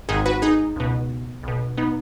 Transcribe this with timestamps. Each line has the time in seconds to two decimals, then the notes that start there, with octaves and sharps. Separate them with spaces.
0.09 G#1 G#2 D#3 D#4 G#4
0.26 F#4 B4
0.42 D#4 G#4
0.76 C#2 B2
1.43 B1 B2
1.77 B3 D#4